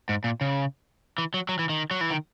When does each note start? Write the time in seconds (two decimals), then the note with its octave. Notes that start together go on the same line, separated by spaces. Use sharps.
0.09 G#2
0.24 A#2
0.41 C#3
1.18 E3
1.34 F#3
1.49 F#3
1.59 E3
1.69 D#3
1.91 F#3
2.01 E3
2.11 D#3